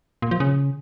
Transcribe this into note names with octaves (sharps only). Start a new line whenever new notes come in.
A#2
F3
C#3